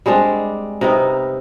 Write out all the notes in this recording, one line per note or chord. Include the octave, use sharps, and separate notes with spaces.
G3 G#3 C4 D4
C3 B3 D#4 A#4